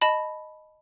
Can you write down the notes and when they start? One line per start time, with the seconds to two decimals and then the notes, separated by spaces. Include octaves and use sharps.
0.02 D#5 A5 B5